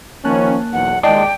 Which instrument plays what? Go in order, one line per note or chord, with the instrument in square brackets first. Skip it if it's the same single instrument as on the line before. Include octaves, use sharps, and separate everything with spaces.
[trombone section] D#3 F3 C#4 [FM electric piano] A#3 A5 F#6
[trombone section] B1 E2 [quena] F#5
[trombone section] D#2 D#3 G#3 [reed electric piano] D5 D#5 A5 [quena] G5 [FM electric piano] D6